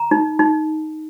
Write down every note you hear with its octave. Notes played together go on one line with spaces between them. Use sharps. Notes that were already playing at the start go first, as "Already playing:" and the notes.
Already playing: A#5
D#4
D#4